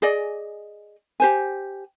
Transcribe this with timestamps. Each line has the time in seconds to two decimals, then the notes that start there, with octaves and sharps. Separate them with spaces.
0.02 G#4 D5 D#5
1.20 G4 C5 G#5